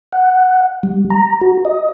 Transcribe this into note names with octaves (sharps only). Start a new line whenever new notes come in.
F#5
G3
A#5
F#4
D#5